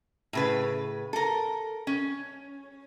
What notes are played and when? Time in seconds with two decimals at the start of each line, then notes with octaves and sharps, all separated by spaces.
0.33 A2 C#3 B4
1.13 A4 A#4
1.87 C#4